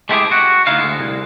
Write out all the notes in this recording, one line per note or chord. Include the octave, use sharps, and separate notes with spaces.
G#3 A3 C4 E4 G4 G#4
F#4
D2 B3 D#4 E4 F5
D2 G#3
C2